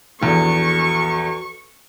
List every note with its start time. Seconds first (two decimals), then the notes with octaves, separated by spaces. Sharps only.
0.22 A#1 E2 F#4 A4 C#6